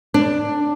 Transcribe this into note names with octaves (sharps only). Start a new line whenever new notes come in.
D4